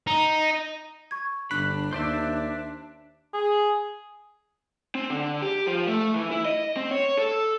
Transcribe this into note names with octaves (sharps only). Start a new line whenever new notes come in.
D#4
C#6 G#6
G1 D4 B5 F#6
D#2 C5 D5 E5
G#4
C4
D3
G4
F3
A3
E3
E4
D#5
C4
C#5
A4